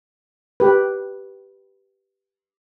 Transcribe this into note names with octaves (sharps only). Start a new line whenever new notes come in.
G4 B4